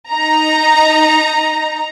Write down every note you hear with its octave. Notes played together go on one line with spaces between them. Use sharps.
D#4 A#5